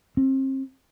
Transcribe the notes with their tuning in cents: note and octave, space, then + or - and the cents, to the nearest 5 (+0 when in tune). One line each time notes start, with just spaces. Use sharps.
C4 +35